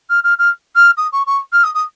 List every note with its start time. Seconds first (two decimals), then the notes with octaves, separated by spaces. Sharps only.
0.10 F6
0.24 F6
0.39 F6
0.76 F6
0.97 D#6
1.12 C#6
1.27 C#6
1.53 F6
1.64 D#6
1.75 D#6